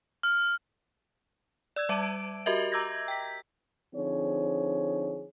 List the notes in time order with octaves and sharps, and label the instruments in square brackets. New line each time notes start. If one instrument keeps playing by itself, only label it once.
[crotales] F6
[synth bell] D5 E6 G#6
G3 E5 A5 D6 D7 D#7
D7
F#4 G4 A#4 D#5 E5
A#5 D6 E6 G6 G#6 A#6
G5 B6
[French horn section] D3 F3 C4 D#4 G#4 C#5